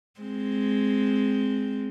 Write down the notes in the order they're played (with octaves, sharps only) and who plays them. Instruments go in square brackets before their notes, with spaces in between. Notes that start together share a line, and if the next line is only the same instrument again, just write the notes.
[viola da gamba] G#3 C4